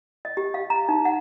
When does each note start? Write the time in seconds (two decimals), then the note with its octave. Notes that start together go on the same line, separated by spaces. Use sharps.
0.25 D#5
0.37 G4
0.54 F5
0.70 A#5
0.89 D#4
1.05 F#5